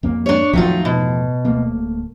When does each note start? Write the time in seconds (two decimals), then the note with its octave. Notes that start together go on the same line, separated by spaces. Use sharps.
0.03 F2 A#3
0.26 D4 C#5
0.53 E2 A2 D#3 F3 F#3 F4
0.85 B2
1.45 D1 A3 A#3